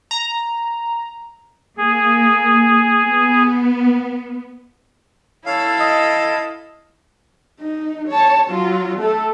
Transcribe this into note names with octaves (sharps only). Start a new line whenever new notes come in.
A#5
A#3 G#4
B3
E4 A4 C#5 F5
D#5
D#4
C#5 A5
F#3 F4
A3 A4